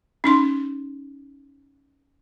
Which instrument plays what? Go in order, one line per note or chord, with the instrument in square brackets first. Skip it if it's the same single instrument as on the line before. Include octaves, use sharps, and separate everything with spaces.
[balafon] C#4 D#4 C6